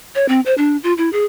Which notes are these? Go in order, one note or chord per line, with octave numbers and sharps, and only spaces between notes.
C#5
C4
C5
D4
F4
E4
G#4